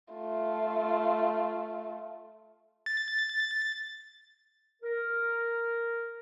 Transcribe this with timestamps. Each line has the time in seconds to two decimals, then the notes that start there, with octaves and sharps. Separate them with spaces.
0.14 A3 F4
2.86 A6
4.83 A#4